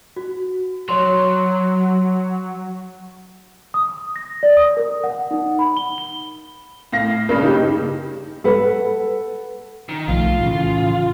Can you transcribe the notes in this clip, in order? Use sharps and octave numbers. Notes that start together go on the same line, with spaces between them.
F#4
F#3 C#5 C6
D#6
A#6
D5
D#6
A#4
F#5
D#4
B5
G7
G7
A2 F5 A#6
G2 C#3 A#3
D#4 G4
A4 B4 F#5
D#3
B1 F3 A3 F4
A2 C#3 E3